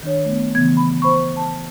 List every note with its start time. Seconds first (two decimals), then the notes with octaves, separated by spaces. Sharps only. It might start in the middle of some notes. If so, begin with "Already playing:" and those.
0.03 D#3 D4 C#5
0.25 A3 B3
0.55 C#3 E3 B3 G#6
0.77 B5
1.02 C5 B5 C#6
1.37 A5